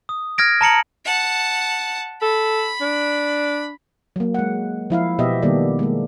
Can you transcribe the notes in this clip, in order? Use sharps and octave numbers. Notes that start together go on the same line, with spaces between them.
D#6
F6 G#6 A#6 D7
A5 A#5 C#7 F#7
F#5 A5
A4 B5
D4
F#3 A#3
G#3 F#5
F3 E4 F5
B2 B3 G4 D#5 E5
D#3 G3 A#3 B3 A4 D5
G#3 A#3